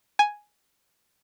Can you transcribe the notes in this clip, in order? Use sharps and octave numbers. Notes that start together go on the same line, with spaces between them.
G#5